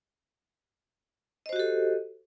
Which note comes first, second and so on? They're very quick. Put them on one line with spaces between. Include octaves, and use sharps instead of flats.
D#5 C5 F#4 G4 A4